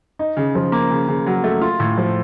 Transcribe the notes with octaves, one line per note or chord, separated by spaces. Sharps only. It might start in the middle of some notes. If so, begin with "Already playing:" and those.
D#4
C#3
F3
A#3
C#3
C#3
F#3
A3
F4
A2
F3